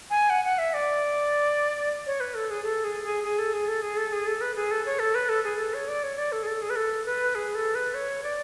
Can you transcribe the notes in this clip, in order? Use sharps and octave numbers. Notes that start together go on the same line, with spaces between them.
G#5
F#5
F#5
E5
D5
C#5
B4
A4
G#4
A4
G#4
G#4
G#4
A4
G#4
A4
G#4
A4
G#4
A4
B4
G#4
A4
C#5
A4
B4
A4
G#4
A4
C#5
D5
C#5
D5
A4
G#4
A4
G#4
B4
A4
B4
G#4
A4
B4
C#5
D5